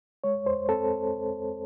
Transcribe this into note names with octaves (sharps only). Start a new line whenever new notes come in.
G#3 C#5
E2 C5
C4 A4